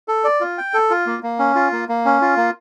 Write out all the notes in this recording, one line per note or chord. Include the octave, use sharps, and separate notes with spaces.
A4
D5
F4
G5
A4
F4
A#3
A#3
C#4
F4
A#3
A#3
C#4
F4
A#3